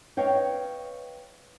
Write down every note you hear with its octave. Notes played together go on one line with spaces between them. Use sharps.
B4 C#5 D#5 F5 G5